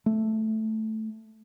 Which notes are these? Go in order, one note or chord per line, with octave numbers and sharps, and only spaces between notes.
A3